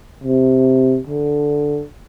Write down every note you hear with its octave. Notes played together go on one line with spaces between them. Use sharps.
C3
D3